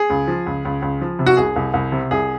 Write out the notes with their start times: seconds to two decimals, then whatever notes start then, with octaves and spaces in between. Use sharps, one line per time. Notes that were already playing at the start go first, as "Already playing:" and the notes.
Already playing: G#4
0.10 C#2
0.28 F3
0.46 C#2
0.65 C#2
0.82 C#2
1.01 F3
1.19 C3
1.26 F#4
1.37 C2 G#4
1.56 C2
1.74 C2
1.92 C3
2.11 C2 G#4